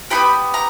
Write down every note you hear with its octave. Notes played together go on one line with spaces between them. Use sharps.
B3 D#4 G4 B5
A#5